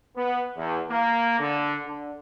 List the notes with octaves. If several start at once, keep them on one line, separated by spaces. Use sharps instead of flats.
B3
E2
A#3
D3
D3